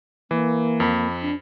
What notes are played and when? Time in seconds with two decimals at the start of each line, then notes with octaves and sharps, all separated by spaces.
0.31 E3 A#3
0.80 F2 B5
1.22 D4